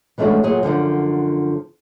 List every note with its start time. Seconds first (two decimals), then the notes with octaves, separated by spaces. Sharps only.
0.18 E3 G#3 A3 C#4 D4 F#4
0.43 A#2 F#3 G#4
0.63 F#2 A2 D3 F3